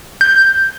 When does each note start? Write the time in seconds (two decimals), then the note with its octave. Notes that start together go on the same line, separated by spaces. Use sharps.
0.21 G6